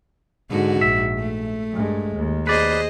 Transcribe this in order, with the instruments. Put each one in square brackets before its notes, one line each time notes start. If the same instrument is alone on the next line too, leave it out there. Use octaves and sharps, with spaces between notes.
[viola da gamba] G#2 F#4 [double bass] D3
[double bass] A#1 [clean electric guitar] E5
[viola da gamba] A3
[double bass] G2 G#3
D#2
[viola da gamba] G#4 C5 D#5 [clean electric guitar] B4 D5